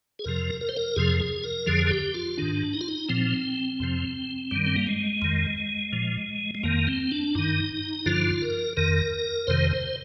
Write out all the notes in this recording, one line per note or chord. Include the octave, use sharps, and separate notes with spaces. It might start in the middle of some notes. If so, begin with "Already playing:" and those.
G#4
F2 C3 F3 A#4
A#4
C5
A#4
F2 C3 F3 G#4
G#4
A#4
F2 D3 F3 G#4
G#4
G4
F4
G#2 D#3 D4
D#4
F4
D#4
A#2 F3 C4
F2 C3 F3
G2 D#3 G3
C4
A#3
G#3
F2 D#3
A#2 F3
G#3
F2 D#3 A#3
C4
D4
G2 D#3 D#4
G2 D3 F3 F4
A#4
F2 D#3 A#4
F2 C3 D#3 C5
C5